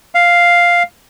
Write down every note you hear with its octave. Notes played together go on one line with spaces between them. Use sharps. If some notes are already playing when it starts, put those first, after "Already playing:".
F5